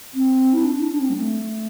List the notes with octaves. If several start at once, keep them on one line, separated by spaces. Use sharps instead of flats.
C4
E4
D4
D4
D4
C4
G3
A3